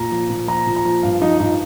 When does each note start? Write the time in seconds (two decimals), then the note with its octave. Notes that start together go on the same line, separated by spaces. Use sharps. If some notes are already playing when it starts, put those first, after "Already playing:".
Already playing: A#2 A#5
0.12 F3
0.30 A#2
0.48 F3 A#5
0.67 A#2
0.76 A#5
0.85 F3
1.03 G2 F5
1.22 F3 D#4
1.40 G2 D#4